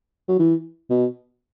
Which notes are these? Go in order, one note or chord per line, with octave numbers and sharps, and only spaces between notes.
F#3
E3
B2